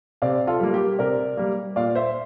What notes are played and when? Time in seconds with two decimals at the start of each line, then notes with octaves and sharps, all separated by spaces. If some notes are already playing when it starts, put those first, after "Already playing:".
0.22 C3 D5 F5
0.47 F4 A4
0.60 G3 A#3
0.73 G4 A#4
0.99 C3 A#4 D5
1.37 G3 A#3
1.76 A#2 D5 F5
1.95 C5 E5